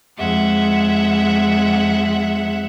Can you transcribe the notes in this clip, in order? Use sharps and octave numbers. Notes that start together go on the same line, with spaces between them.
F2 G#3 E5 F#5